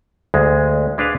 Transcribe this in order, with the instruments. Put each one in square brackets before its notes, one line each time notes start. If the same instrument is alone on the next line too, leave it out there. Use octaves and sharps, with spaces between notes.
[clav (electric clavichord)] D2 G#3
G#3 D4 B4 F5 G#5